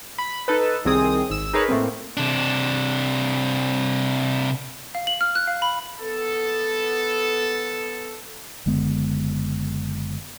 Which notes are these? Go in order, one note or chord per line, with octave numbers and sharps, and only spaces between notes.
B5
D#4 A4 B4
C2 D#3 C4 G#4 D#6
G#1 E6
D#4 G#4 A#4 B4 C#5
A2 A3 A#3 C4
C3 D4
F5
F#7
F6
F#6
F5
B5
B3 A4
F#1 D3 G#3 B3